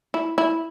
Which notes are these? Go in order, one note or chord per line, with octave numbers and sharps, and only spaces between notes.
E4
E4